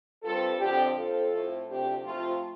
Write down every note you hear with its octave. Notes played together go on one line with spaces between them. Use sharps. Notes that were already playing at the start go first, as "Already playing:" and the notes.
G2 G3 C4 F4 A4
F2 D3 F3 C4 D4 G4
F2 F3 C4 F4 A4
A2 A3 C4
D2 C3 F3 A3 C4 D4 G4
C3 F3 A3 C4 F4